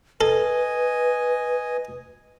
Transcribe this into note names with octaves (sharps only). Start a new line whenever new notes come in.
A4 B4 D#5 G#5